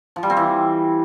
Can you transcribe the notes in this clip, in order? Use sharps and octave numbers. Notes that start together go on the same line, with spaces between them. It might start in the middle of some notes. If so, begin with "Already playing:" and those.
F3
G3
C4
E3